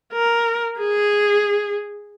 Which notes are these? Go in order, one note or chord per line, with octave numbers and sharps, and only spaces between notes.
A#4
G#4